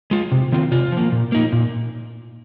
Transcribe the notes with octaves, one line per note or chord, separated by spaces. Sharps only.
G#3 F4
C3
D#3 C4 F4
C3 F4
F3 A#3
A#2
A#3 D#4
A#2